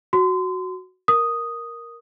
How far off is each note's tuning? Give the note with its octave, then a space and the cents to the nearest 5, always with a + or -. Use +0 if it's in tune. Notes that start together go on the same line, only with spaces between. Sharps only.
F#4 +0 C6 -30
A#4 +0 D#6 +0